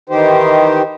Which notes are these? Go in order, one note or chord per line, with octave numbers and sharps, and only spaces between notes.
D#3 E3 D#4 G4 C5